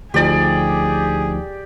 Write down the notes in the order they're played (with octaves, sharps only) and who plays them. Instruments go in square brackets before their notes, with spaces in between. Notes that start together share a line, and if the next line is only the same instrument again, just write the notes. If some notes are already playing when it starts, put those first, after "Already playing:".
[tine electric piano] D2 F3 D#4 [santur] G4 D5 [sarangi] G#4